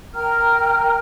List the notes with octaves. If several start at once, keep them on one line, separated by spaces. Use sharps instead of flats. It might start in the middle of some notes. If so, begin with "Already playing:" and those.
A#4 G5 A#5 F6